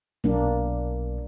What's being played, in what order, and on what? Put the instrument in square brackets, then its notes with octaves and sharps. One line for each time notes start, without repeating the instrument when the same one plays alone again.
[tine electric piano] B1 [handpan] A#3 D4